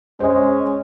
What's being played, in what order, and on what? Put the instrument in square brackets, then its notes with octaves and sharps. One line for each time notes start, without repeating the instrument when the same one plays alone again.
[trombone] G#3 [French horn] C#4 [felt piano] C5 D#5